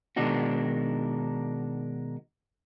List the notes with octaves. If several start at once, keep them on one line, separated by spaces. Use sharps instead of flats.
B2 D#3 G#3 D4 D#4 F#4